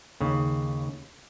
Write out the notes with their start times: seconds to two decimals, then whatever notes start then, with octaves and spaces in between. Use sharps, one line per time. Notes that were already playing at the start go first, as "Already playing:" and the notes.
0.20 D#2 C#3